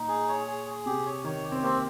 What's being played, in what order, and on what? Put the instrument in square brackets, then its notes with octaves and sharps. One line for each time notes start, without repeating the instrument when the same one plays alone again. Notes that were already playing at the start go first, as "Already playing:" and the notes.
Already playing: [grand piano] A#2 [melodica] D#4
[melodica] G#4
C#5
G#4
G#4
[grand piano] C3 [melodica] G4
[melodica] C#5
[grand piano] D#3 [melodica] C#5
[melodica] G4
[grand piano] C4
[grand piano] A#3 [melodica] C4